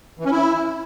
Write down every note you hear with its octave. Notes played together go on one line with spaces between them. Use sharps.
E3
C#4
E4